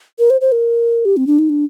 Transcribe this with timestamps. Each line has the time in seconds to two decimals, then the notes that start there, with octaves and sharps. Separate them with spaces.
0.19 A#4
0.30 C5
0.41 C5
0.52 A#4
1.05 G4
1.17 C4
1.27 D4
1.39 D#4
1.50 D4